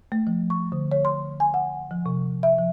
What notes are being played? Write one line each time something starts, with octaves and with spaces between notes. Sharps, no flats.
A3
F3
C#6
D3
C#5
C6
G#5
F#5
F3
C3
E5
F3